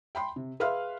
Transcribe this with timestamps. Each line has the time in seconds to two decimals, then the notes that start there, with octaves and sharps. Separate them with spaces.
0.15 G5 B5 C6
0.36 C3
0.60 G#4 B4 E5 F5 C6 F6